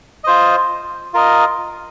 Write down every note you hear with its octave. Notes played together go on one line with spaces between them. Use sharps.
F4 C5 D#5
F4 A#4 D#5